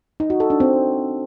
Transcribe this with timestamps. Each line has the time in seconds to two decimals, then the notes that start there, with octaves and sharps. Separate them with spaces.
0.20 D#4
0.30 F#4
0.40 A4
0.50 D4
0.60 C4